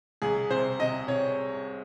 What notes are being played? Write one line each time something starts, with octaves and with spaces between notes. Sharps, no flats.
C2 G#4
C3 C5
C3 D#5
C3 C#5